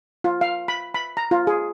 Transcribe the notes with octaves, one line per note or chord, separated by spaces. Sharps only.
F4
F5
B5
B5
A#5
F4
G#4